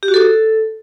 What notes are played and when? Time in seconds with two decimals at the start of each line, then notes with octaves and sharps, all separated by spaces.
0.03 G4
0.08 F#4
0.14 A4